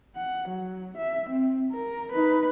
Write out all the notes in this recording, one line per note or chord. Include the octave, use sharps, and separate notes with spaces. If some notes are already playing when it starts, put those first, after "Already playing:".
F#5
F#3
E5
C4
A#4
D#4 B4